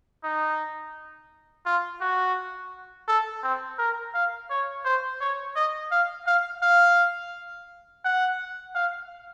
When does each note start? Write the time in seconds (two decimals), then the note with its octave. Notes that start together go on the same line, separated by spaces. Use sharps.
0.24 D#4
1.66 F4
2.01 F#4
3.08 A4
3.43 C4
3.79 A#4
4.14 F5
4.50 C#5
4.85 C5
5.21 C#5
5.56 D#5
5.92 F5
6.27 F5
6.63 F5
8.05 F#5
8.75 F5